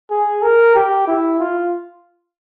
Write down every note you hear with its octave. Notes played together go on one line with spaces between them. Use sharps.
G#4
A#4
G4
E4
F4